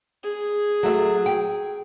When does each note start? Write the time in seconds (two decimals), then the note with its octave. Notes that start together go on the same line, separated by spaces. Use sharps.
0.23 G#4
0.83 F#3 A3 E5
1.26 G5